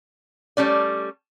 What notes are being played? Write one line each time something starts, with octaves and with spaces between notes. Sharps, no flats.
G3 A3 C#4 D5